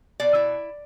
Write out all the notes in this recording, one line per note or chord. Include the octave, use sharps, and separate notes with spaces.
B2 D5
E4